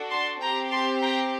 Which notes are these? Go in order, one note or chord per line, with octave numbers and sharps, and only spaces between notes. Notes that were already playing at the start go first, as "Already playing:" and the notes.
Already playing: D4 F#4 A4
A5 C6
C4 G4 G5 A#5
A5 C6
G5 A#5